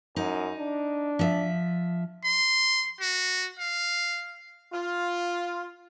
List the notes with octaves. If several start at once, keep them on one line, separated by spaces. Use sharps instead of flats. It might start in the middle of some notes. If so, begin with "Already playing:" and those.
F#2 D#4
D4
F3 E5
C6
F#4
F5
F4